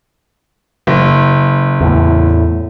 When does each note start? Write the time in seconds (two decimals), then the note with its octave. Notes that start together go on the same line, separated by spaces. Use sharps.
0.87 F#1
1.81 E2 A2